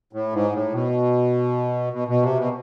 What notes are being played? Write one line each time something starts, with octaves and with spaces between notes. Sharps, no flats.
A2
G#2
A2
B2
B2
B2
C3
B2